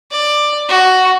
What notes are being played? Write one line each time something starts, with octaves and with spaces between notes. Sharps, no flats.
D5
F#4